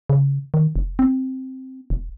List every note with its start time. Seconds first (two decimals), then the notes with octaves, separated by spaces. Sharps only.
0.10 C#3
0.54 D#3
0.76 F1
0.99 C4
1.90 E1